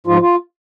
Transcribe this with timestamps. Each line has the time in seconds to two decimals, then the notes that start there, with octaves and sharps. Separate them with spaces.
0.07 G#2 F3 F4
0.22 F4